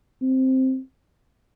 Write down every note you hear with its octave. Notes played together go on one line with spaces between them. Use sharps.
C4